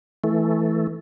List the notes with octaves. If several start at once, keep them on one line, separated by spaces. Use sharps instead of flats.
E3 A3